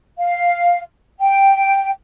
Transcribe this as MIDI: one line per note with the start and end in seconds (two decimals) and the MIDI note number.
0.18 0.81 77
1.20 1.90 79